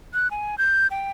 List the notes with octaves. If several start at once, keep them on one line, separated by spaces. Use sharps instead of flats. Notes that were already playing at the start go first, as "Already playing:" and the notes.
F#6
G#5
G6
G5